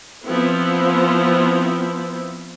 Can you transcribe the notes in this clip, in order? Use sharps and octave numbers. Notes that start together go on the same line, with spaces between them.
F3 B3 C4 E4